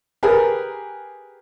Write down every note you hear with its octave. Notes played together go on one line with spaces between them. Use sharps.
G4 G#4 A#4 B4